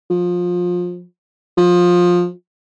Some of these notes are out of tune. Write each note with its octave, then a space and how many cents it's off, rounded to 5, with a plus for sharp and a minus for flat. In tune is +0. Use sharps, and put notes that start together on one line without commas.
F3 +25
F3 +20